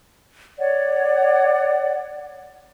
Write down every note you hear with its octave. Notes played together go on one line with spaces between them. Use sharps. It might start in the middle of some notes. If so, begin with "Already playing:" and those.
C#5 D5 F#5